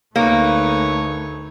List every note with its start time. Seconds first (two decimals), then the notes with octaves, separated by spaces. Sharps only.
0.16 D2 A3 A#3 D#4 B4 C#5